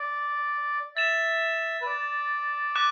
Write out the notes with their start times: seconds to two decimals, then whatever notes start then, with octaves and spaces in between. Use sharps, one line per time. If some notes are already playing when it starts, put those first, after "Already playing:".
Already playing: D5
0.96 E5 A6 E7
1.82 B4
1.86 D5
2.76 D6 F#6